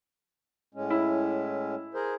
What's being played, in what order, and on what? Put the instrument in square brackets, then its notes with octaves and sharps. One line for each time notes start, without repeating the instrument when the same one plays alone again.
[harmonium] A2 G#3 C#4
[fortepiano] E4
[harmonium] G#4 A#4 C5